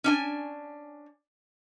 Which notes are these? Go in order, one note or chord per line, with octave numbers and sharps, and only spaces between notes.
C#4 D4 G#5